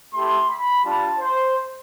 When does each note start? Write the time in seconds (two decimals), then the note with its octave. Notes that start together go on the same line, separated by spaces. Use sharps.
0.14 A3 E4 G4 C6
0.49 B5
0.84 G3 D4 F4 A5
1.19 C5